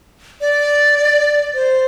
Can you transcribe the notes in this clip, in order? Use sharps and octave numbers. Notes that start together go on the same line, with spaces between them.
D5
C5